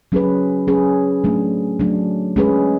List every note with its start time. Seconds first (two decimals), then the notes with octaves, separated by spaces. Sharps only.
0.12 F#3 C#4 G#4 B4
0.67 F#3 C#4 G#4 B4
1.24 F#3 A3 D4
1.80 F#3 A3 D4
2.36 G#3 C#4 G#4 B4